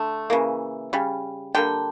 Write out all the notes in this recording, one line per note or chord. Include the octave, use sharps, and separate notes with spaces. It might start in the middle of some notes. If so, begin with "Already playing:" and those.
Already playing: D3 A3
C#3 E3 A#3
C#3 G3
D3 G3 A#3 G5